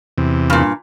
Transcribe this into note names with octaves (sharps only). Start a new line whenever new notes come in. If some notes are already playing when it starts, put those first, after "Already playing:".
E2 C3
G2 A#2